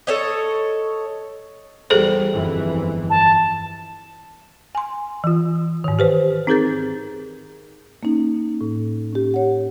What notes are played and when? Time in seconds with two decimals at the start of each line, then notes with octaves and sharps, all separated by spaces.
0.07 A4 C#5 D#5
1.90 E2 G3 G#4 A4 C5
2.33 G1 F2 E3
3.10 A5
4.75 G#5 C6
5.24 E3 F4
5.84 G#2 D#3
5.99 G4 B4 C5
6.47 C4 D#4 G#4 A#4 G6 A6
8.03 A#3 C#4 D#4
8.61 A2
9.13 C#4 G4
9.34 C#5 F#5